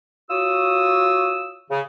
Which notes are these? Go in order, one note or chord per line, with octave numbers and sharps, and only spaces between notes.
F4 F#4 C#5 D#6 E6
C#3